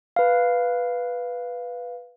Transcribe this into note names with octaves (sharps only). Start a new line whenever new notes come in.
B4 F5